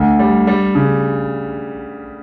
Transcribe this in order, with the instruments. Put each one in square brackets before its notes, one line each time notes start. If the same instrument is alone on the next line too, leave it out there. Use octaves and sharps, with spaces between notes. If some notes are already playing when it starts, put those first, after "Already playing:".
Already playing: [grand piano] D2
G3
G3
C#3